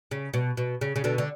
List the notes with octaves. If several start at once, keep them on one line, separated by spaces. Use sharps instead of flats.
C#3
B2
B2
C#3
C#3
B2 D3
D3